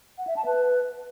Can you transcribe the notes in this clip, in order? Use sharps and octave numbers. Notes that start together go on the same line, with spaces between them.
F#5
E5
A5
B4